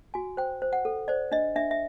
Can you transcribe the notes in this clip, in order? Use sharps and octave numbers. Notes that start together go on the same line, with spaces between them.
F#4 G#5
C5 G5
C5
F#5
A4
C5 D5
D4 D#5
D4 E5
E5